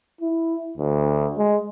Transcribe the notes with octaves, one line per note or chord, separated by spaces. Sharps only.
E4
D2
G#3